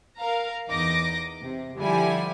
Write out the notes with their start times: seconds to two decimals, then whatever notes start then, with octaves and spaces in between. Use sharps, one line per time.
0.17 A#4 F5 A#5
0.70 E2 D#4 D#5 D6 A#6
1.41 C3
1.77 D3 F3 G3 E4 G#5